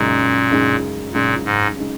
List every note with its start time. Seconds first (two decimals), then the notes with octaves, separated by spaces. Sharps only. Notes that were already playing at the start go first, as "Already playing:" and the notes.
Already playing: F#2 A#2 C#3 G#3 D#4
0.51 F#2 C#3 G#3 D#4
1.13 F#2 A#2 C#3 G#3 D#4
1.45 G#2
1.77 C#3 G#3 D#4